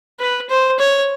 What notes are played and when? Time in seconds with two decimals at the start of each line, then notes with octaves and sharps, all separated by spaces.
0.20 B4
0.49 C5
0.79 C#5